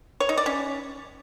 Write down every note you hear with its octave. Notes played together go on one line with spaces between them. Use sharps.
C#5
D#4
D5
C#4